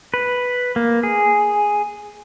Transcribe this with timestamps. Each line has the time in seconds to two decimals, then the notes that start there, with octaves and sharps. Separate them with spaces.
0.14 B4
0.76 A#3
1.03 G#4